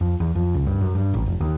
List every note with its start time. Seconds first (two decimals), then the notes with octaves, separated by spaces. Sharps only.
0.01 F2
0.20 E2
0.35 F2
0.54 C#2
0.67 G2
0.81 F#2
0.95 G2
1.14 A1
1.26 F1
1.40 D#2